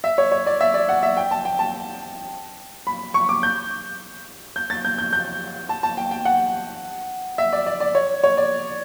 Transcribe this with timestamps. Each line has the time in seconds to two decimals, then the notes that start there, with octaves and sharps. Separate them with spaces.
0.04 E5
0.18 C#5
0.32 C#5
0.46 D5
0.61 E5
0.74 D5
0.89 F#5
1.03 E5
1.17 G5
1.31 A5
1.45 G5
1.59 A5
2.87 B5
3.14 C#6
3.29 D6
3.43 G6
4.56 G6
4.70 A6
4.85 G6
4.98 G6
5.13 G6
5.69 A5
5.83 A5
5.97 G5
6.11 G5
6.25 F#5
7.38 E5
7.53 D5
7.66 D5
7.80 D5
7.95 C#5
8.24 C#5
8.37 D5